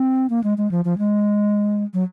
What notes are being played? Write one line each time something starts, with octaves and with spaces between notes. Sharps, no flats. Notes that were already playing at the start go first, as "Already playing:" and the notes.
Already playing: C4
A#3
G#3
G#3
F3
F3
G#3
F#3